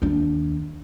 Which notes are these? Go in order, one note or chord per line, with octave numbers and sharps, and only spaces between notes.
D#2 D4